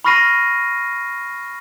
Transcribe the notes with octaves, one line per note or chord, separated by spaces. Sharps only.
B5 C#6 F6 A#6 C7 D#7